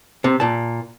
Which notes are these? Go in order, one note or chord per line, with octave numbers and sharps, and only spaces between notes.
C3
A#2 A5